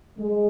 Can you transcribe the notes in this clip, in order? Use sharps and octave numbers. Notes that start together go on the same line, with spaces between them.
G#3